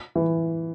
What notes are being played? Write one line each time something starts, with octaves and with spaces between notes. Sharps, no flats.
E3